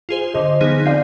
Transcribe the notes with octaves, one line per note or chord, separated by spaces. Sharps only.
F4 G#4 C5
D3 C5 D#5
F3 B3 D#4 G#4
C4 D5 F5